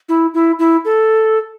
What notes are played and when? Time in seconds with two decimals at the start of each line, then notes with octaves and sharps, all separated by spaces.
0.09 E4
0.34 E4
0.59 E4
0.85 A4